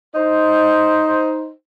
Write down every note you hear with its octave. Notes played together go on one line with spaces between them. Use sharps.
D#4 C5